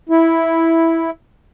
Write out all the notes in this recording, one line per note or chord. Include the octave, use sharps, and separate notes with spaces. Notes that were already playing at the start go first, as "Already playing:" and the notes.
E4